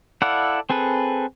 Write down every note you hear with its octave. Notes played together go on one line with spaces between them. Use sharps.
E4 A4 D5 F5 F#5
C4 G#4 A4 B4